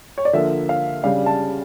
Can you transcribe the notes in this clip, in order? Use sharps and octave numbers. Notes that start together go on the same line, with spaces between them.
C#5
D5
D3 F3 A#3 E5
F5
C#3 G3 D4 F5
A5